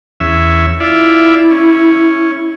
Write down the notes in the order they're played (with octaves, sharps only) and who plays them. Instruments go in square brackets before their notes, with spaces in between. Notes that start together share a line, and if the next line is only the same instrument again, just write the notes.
[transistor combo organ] E2 C#4 E5
[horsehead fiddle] E4 [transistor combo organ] F4 D5 E5
[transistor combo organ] C#4